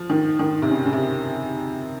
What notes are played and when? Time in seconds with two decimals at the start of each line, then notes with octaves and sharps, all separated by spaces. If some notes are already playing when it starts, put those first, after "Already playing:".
Already playing: F3
0.10 D#3
0.39 D#3
0.62 C3
0.70 C#3
0.85 C#3
0.93 C3